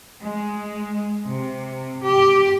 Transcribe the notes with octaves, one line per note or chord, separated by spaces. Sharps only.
G#3
C3
G4